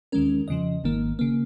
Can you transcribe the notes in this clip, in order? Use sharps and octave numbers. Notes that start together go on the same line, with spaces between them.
D#2 D#3 G#3 C#4 A#4
F2 C#3 F3 D#5
G#1 G#2 D#3 A#3
C#3 A#3